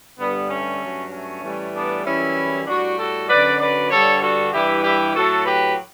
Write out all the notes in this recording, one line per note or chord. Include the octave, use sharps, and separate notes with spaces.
G2 D3 G3 B3
A3 C#4
G2 F#3
A3 C#4
A2 E3 G3
B3 D4
F#2 E3 G3 C#4 E4
A2 G3 D4 F#4
F#4 A4
F#2 D3 F#3 B4 D5
B4 D5
G2 D3 G3 A4 C#5
F#4 A4
G2 E3 G3 E4 G4
E4 G4
A2 F#3 F#4 A4
G4 B4